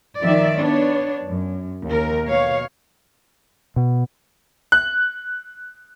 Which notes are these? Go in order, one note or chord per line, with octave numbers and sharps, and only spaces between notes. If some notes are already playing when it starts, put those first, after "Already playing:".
D#3 F3 D5 E5
B3 D4 C#5
F#2
D#2 A#4
B2 C#5 F5
B2
F#6